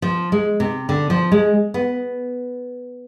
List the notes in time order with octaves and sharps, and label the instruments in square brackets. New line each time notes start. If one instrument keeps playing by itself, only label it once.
[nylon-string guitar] F3
G#3
C3
D3
F3
G#3
B3